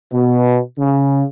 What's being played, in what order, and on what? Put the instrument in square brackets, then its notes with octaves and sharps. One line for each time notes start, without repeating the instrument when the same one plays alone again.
[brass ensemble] B2
C#3